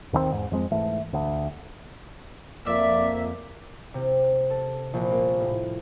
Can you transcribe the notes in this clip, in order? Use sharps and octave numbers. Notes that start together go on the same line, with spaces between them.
D#2 D#3 F3 C4
E2 G#2
F2 G#3 C4
G#2 E3 A3
D2
F2 A#3 D5 E5
C3
A4
A#1
A#3
A2